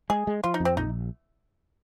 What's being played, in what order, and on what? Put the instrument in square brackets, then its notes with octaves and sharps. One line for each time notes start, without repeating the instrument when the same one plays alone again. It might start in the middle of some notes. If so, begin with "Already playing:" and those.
[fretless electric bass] G#3 [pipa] G#4
[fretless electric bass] G#3
[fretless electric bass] F3 [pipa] F4
[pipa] D#4
[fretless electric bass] F2
[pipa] C4
[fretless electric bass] A#1 [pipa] D#4